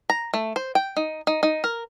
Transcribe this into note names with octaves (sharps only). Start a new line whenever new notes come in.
A#5
A3
C5
G5
D#4
D#4
D#4
A#4